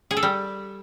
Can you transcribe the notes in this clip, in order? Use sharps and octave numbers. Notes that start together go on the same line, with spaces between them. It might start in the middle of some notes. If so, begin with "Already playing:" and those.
G#4
A4
G3